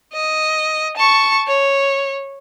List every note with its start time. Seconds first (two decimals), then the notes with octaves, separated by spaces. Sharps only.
0.13 D#5
0.97 A5 C#6
1.47 C#5